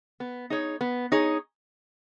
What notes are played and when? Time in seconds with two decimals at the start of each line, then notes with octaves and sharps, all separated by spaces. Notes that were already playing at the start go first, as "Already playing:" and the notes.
0.20 B3
0.50 D#4 G#4 C#5
0.81 B3
1.12 D#4 G#4 C#5